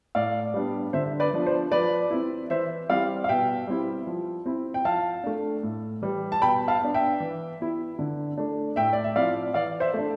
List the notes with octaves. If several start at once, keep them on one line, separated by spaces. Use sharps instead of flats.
A2 D5 F5
G3 B3 D4
D3 C5 E5
B4 D5
F3 B3 D4
C5
F3 B4 D5
C4 E4
E3 C5 E5
G3 C4 E4 D5 F5
F5
B2 E5 G5
G3 C4 E4
F3
C4 E4
G5
F3 F5 A5
A3 D4
A2
E3 G3
A5
B2 G5 B5
F5 A5
B3 D4
E5 G5
E3
B3 E4
D3
A3 D4
A2 E5 G5
D5
E5
F3 C4 E4 D5 F5
E3 D5 F5
C5 E5
A3 D4